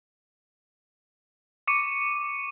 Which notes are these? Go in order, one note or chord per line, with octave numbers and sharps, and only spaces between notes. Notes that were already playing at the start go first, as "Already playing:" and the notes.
C#6 D6 C#7 D#7